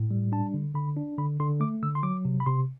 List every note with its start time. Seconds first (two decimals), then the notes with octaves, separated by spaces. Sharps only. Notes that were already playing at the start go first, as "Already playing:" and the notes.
Already playing: A2
0.11 G3
0.32 D4 A5
0.54 D3
0.75 D3 B5
0.97 D4
1.18 D3 B5
1.40 D3 C6
1.60 A3 D6
1.82 D3 E6
1.95 C6
2.03 F#3 D6
2.25 C3
2.40 B5
2.46 C3 C6